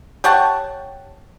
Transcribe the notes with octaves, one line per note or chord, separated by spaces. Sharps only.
G4 C#5 F#5 A5